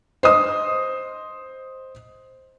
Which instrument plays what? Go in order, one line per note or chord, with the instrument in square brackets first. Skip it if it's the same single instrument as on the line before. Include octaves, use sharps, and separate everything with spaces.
[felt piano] C5 D#5 D#6